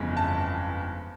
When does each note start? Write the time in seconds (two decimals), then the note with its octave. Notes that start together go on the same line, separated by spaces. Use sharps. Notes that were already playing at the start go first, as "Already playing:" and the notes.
Already playing: G1 F2 C#3 E3 G#3
0.17 A5